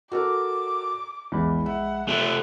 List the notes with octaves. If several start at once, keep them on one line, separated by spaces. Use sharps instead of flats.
F#4 A4 A#4 D6
A#1 E2 G#3 B5
E5 F#5
C3 A3 F#6